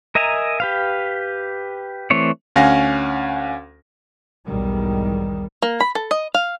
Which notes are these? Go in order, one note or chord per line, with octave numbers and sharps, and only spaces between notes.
A#4 D#5 E5 G#5 A#5
G4 B4 F5
E3 A3 C4 C#5 D5
D2 C#4 F5 F#5 G#5 A#6
B1 E2 G#2 D#3 G3
A#3
B5
A4
D#5
F5